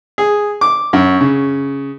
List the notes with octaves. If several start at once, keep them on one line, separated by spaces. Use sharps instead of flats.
G#4
D6
F#2
C#3